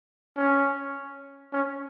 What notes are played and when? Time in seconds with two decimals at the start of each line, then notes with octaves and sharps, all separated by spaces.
0.36 C#4
1.53 C#4